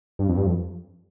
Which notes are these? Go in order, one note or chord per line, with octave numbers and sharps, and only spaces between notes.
G2
F2
G2
F2